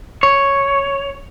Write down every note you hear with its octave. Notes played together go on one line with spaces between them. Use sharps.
C#5